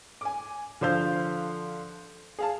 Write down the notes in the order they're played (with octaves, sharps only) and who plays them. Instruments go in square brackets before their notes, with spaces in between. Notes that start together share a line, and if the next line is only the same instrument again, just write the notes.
[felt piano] G#5 D6
D3 F3 C5 F5 G6
G#4 F5 A5